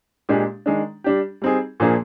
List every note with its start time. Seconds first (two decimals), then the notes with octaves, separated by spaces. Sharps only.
0.29 A#2 G#3 D4 G4
0.66 D#3 G#3 D4
1.04 G3 D4 G4
1.42 G3 C4 D#4 G#4
1.80 A#2 F3 A#3 D4 G#4